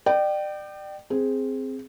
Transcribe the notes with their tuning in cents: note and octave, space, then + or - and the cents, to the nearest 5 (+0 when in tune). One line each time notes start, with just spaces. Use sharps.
D5 +35 G5 -20
C4 +0 G#4 +0